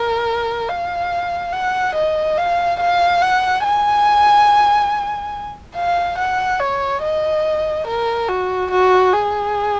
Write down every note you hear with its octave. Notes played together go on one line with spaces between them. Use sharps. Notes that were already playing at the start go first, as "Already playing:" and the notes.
Already playing: A#4
F5
F#5
D#5
F5
F5
F#5
G#5
F5
F#5
C#5
D#5
A#4
F#4
F#4
G#4